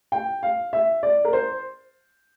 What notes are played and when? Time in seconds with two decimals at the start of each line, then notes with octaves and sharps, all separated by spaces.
0.12 G5
0.43 F5
0.73 E5
1.03 D5
1.25 A#4
1.33 C5